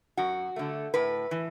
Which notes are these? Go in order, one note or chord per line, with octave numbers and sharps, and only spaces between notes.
F#2 F#4
D3 A3
A2 B4
E3